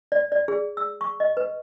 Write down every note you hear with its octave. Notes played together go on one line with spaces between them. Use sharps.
D5
D5
G#4
E6
C#6
D#5
B4